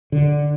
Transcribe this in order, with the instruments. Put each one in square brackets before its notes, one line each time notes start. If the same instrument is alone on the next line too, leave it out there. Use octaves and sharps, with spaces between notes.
[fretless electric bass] D3